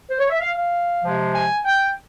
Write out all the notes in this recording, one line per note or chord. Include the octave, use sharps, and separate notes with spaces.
C5
C#5
E5
F5
F5
C3 F3 G#3
G#5
G5